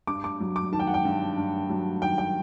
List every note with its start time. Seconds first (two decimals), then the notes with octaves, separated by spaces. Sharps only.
0.07 G2 D6
0.24 D6
0.40 F#3
0.56 D6
0.72 D#3 A5
0.80 G5
0.87 F#5
0.94 G5
1.05 G2
1.38 G2
1.70 F#3
2.02 D#3 G5
2.18 G5